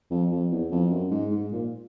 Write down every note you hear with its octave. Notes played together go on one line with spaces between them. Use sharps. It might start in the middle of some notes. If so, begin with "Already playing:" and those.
F2
F2
E2
F2
F#2
G#2
G#2
A#2